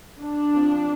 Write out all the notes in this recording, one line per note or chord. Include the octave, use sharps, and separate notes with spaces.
D4
F3 C4